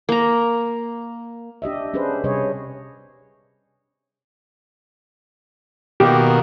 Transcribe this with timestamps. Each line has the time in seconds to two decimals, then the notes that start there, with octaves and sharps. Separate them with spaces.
0.09 A#3 A#5
1.62 D4 G4 D#5 E5
1.94 C#4 D4 G#4 B4 C5
2.24 C3 G3 G#4 C#5 D#5
6.00 B2 D#3 A#3 G4